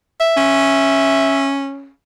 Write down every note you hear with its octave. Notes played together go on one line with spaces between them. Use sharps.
E5
C#4